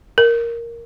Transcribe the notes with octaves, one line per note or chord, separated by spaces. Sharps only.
A#4